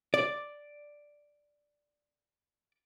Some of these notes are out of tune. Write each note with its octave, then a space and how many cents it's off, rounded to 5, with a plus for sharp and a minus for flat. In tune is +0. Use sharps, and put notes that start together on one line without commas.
D5 +0